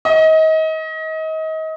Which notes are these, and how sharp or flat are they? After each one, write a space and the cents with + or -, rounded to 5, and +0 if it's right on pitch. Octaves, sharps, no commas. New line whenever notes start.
D#5 +30